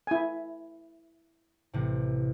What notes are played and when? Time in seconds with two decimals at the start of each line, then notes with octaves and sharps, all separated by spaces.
0.07 E4 G#5
1.73 A1 C3